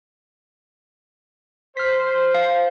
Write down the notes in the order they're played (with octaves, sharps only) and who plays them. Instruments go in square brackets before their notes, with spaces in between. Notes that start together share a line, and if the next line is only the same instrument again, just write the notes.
[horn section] C5 [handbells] F6 B6
[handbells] F5